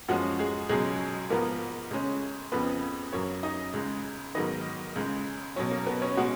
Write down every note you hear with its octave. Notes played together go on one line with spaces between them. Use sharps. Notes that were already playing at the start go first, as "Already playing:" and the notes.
F#2 F3 G#3 C#4 F#4 F#5
G#3 G#4
C#2 B2 F#3 G#3 C#4 G#4
G#2 F3 A#3 B3 A#4
C#2 C#3 G#3 C#4
F2 C#3 F3 B3 B4
F#2 C#3 F#3 A#3 C#4 C#5
D#4 D#5
C#2 C#3 G#3
G#2 D#3 F#3 B3 D#4 D#5
C#2 C#3 G#3
B2 F#3 C#4 C#5
A#3 A#4
B3 B4
C#4 C#5
B2 G#3 C#4 F#4 F#5